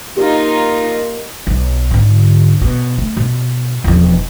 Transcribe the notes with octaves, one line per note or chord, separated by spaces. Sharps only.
A#3 D#4 F4 G4
B1
G#2 D3
B2
A3
B2
E1 F3